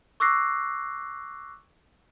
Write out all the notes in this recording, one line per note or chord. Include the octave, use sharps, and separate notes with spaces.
C#6 D6 E6 F#6 A#6 C7